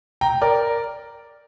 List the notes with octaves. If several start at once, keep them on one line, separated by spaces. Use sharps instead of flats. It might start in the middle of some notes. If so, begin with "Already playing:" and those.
G5 A#5
A#4 D5